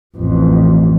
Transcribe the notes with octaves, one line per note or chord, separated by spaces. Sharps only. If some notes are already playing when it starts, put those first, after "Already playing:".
A1 F2